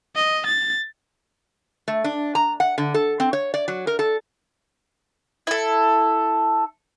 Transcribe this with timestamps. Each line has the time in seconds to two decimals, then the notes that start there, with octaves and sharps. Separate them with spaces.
0.16 D#5
0.46 A6
1.88 A3
2.04 D4
2.35 A#5
2.60 F#5
2.78 D3
2.94 A4
3.20 C4
3.33 C#5
3.54 D5
3.68 F#3
3.87 A#4
3.99 A4
5.47 E4 A4